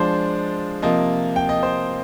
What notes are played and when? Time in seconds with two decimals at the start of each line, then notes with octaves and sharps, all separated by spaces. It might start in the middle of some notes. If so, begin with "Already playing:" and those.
Already playing: F3 G#3 D4 C5
0.82 C3 F3 A#3 D#5
1.36 G5
1.49 D#5
1.63 C5